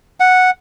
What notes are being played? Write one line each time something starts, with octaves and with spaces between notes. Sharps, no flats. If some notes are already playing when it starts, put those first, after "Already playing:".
F#5